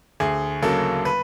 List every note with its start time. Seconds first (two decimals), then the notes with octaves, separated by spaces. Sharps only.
0.20 D2 G#4
0.62 C#3 F#3 A#3 A4
1.05 B4